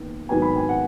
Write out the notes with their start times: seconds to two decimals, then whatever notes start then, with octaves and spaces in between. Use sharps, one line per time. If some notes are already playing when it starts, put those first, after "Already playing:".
Already playing: D#2 D#3 B3
0.29 G#2 D#3 F#3 B3 G#5
0.42 B5
0.56 G#5
0.69 F#5